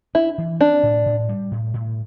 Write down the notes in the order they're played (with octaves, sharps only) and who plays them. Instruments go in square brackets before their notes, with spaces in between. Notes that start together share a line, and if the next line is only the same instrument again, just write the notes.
[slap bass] D4 [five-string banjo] E4
[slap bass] E3
[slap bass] C4 [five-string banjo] D4
[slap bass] A2
A2
G3
A2
A2